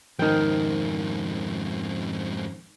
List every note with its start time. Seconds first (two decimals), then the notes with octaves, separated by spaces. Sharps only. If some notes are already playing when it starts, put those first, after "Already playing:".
0.19 F2 G#2 D#3 G5